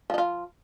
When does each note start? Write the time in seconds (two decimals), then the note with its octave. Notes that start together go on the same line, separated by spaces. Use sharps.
0.10 F3
0.14 D#4
0.18 F4